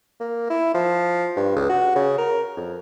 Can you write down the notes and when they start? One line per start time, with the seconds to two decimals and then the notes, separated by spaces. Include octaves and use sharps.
0.20 A#3
0.50 E4
0.74 F3
1.36 G2
1.56 C#2
1.69 F#4
1.95 C#3
2.18 A#4
2.57 F2